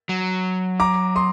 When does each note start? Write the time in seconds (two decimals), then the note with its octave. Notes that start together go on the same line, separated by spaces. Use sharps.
0.09 F#3
0.80 A#5 D6
1.15 C6 D#6